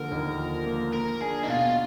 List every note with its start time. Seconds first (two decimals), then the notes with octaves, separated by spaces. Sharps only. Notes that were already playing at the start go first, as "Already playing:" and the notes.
Already playing: D3 F3 A#3 A#4
0.12 D#2
0.38 F3
0.66 A#3
0.93 A#3 A#4
1.21 D4 G#4
1.43 D#4
1.48 B2 F4